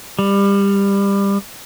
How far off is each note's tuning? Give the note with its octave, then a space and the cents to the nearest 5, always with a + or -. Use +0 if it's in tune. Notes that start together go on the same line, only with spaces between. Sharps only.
G3 +25